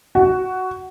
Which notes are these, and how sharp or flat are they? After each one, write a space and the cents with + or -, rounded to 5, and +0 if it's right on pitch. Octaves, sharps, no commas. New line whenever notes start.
F#4 +10